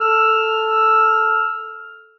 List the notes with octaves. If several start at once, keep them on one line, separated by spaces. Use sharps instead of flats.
A4 E6 F6